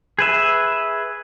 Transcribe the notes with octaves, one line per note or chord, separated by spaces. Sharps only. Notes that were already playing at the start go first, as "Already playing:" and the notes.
G#4 B4 E5